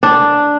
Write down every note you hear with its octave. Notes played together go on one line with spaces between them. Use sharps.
D4